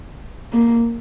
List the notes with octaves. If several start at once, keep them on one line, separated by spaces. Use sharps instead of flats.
A#3